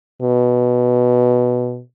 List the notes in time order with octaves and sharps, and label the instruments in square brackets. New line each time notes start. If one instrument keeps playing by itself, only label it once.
[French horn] B2